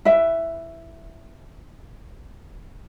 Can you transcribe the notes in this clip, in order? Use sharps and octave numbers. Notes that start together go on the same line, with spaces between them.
E4 B4 E5